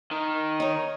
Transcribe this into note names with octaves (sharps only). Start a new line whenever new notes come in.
D#3
D#4 C#5